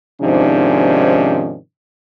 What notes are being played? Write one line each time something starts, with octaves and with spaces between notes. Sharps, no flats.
G#2 C3 D#3 F3 C#4 D4